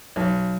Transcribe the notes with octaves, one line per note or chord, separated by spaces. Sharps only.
B1